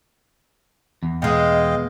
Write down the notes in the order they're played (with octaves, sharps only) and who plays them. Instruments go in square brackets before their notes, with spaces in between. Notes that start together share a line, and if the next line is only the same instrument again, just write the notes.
[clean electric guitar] E2
[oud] B2 G#3 [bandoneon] D#5 F5 G5